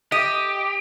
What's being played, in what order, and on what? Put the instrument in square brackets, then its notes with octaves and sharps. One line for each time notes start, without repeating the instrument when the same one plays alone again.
[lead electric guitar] G4 [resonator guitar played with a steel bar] D#5